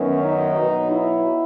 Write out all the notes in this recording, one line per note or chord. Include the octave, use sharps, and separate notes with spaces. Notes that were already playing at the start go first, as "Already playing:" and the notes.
Already playing: F#2 D#3 F#3 B3 C#4
D#4
B2 F#3 B3
E4